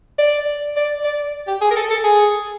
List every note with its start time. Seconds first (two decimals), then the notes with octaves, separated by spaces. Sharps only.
0.18 D5
0.77 D5
1.04 D5
1.48 G4
1.61 G#4
1.71 A#4
1.76 A4
1.91 A4
2.04 G#4